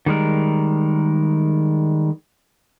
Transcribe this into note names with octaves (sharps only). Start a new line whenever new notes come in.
D#3 G3 G#3 A#4